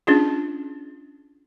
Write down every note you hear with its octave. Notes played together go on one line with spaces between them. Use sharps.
C#4 D4 F4 G#4